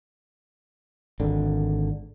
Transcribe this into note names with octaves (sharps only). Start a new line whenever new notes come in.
G#1 D3